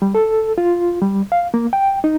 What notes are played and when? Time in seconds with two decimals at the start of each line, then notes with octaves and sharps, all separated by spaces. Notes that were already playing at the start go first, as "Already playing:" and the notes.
0.02 G3
0.15 A4
0.58 F4
1.02 G3
1.32 F5
1.54 A#3
1.73 G5
2.04 D#4